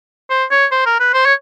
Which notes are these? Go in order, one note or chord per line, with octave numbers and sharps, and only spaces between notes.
C5
C#5
C5
A#4
B4
C5
C#5